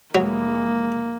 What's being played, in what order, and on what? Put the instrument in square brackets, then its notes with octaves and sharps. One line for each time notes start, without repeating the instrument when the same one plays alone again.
[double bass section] F1 E3 G#3 [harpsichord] F#3 [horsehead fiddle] A#3